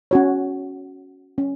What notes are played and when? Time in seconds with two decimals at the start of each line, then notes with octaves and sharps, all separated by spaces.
0.11 C#4 F#4 C#5
1.38 C#4